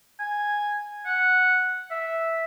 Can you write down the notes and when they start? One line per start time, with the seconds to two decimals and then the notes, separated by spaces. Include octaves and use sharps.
0.20 G#5
1.05 F#5
1.90 E5